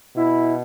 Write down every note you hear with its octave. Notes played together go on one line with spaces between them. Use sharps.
B2 E4